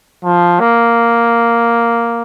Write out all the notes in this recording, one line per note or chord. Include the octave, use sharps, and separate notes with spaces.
F3
A#3